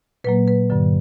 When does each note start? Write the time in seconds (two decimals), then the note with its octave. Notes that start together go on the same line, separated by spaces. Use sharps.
0.24 A#2 F#3 A#3 B4
0.48 B4
0.70 G2 D3 F#3